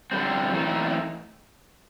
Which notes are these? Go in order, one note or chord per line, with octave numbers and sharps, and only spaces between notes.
D3 G3 C4
E3 A3 C4 D#4